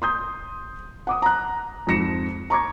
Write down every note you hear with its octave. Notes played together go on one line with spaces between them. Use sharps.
C6 D#6 G6
F#5 D6 D#6
A#5 F#6
F2 G#2 F3 A#6 C#7 E7
A#5 C#6 D6 G#6